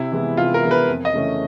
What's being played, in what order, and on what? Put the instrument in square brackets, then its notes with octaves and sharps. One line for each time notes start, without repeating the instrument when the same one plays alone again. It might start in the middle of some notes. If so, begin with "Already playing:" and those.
Already playing: [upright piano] C3 [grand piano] E4
[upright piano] E3 G#3 B3
[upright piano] C3 [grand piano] F4
[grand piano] A#4
[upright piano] E3 G#3 B3
[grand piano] B4
[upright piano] F2
[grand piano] D#5
[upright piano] C#3 E3 A3 C#4